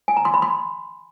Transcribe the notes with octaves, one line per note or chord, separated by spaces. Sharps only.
G#5
A#5
C6
B5
C6